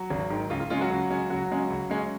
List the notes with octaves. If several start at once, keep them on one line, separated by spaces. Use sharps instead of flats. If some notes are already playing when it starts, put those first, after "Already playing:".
Already playing: F#3 F#4
G#1
G#2 D#3
C#2 F4
F4
C#3 G#3 C#4 F4
F#3 F#4
C#2
C#3 G#3 C#4
C#2 F#3 F#4
C#3 G#3 C#4
C#2
C#3 G#3 C#4